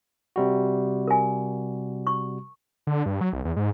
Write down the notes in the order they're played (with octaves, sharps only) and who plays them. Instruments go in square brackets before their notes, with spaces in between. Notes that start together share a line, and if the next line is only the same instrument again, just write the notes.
[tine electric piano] C3 G3 F#4
[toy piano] A#4 G#5
C#6
[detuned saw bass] D3
G2
F#3
C2
E2
G#2